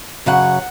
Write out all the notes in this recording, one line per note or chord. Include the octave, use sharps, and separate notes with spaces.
F#2 C#3 F#3 F#5